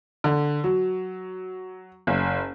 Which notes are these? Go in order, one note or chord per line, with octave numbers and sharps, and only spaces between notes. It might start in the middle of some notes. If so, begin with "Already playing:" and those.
D3
F#3
F#1